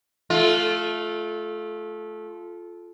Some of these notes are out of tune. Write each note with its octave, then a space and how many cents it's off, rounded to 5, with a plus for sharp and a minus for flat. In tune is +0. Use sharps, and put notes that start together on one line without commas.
A3 -20 F4 +0